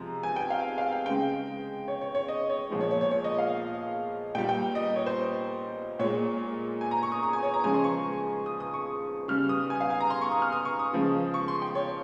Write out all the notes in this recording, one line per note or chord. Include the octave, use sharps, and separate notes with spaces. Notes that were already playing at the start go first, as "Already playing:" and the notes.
Already playing: C3 F3 G#3 A#5
G#5
G5
F5
F5
G5
C#3 G#3 G5
C#5
C#5
C#5
D#5
C#5
A#2 F3 G#3
C#5
C#5
C#5
C#5
D#5
F5
A#2 G3 G5
G5
D#5
C#5
C5
A#2 G#3 C#5
G#5
A#5
C#6
D#6
D#6
G#5
C#5
A#5
C#3 F3 G#3 G#5
C6
C#6
D#6
D#6
C#6
C#3 G3 F6
D#6
G#5
F5
G#5
A#5
C6
C#6
D#6
F6
D#6
C#6
D#6
C#3 F3 G#3
C#6
C6
G5
C#5